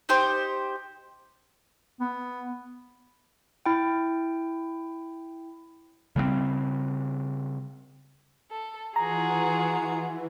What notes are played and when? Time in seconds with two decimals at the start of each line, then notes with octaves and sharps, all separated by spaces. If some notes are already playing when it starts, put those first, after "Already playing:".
0.09 D#4 G4 C5
2.00 B3
3.66 E4 G5
6.16 C#3 G3 A3 C4
8.51 A4
8.96 E3 F4 F#4 G#4 A#5